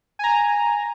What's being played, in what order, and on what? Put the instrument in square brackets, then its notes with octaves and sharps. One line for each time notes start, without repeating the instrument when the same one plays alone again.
[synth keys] G#5 A#5